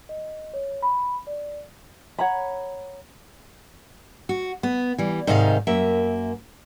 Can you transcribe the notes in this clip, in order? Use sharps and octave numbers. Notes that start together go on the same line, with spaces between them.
D#5
C#5
B5
D5
C#5 F#5 A#5 B5
F#4
B3
E3 G3
G#2 C3 D#3 D#4 E4 F5
F#2 A#3 E5